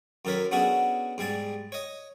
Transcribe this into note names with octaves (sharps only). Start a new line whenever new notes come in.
F#2 D#3 A4 A#4 C#5 B5
B3 C#4 D4 F#4 G#4 A4
G#2 G3 G#4 A5
C#5 D#5